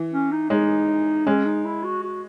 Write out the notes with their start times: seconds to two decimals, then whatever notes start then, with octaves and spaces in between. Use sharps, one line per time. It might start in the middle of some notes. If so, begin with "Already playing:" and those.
Already playing: E3
0.12 C#4
0.32 D#4
0.50 G#3 D#4
1.26 G#3 C#4
1.46 D#4
1.65 E4
1.84 F#4
2.03 F#4